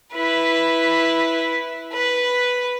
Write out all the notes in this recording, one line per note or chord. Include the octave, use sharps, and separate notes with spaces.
E4 B4
B4